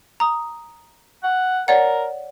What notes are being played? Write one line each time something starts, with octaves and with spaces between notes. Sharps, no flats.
A#5 D#6
F#5
A#4 C#5 D5 F#5